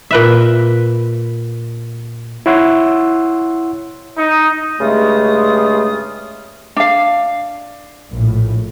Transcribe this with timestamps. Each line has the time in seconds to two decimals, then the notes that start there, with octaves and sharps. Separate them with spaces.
0.11 A#2 B4 E5
2.46 E4 C#5 F#5 C6 E6
4.17 D#4
4.80 G2 C#3 G#3 A3 F4 D#6
6.76 D4 F5
8.09 A#1 A2